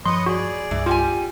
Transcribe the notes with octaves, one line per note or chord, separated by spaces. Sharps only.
G2 F3 B4 C#5 D#5 C6
F#4 G#4 D5
C2 G2 E3
G3 F4 G4 G#5